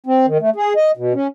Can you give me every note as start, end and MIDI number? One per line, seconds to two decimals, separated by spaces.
0.06 0.26 60
0.27 0.38 51
0.40 0.50 57
0.56 0.73 68
0.76 0.91 75
0.97 1.13 47
1.14 1.27 61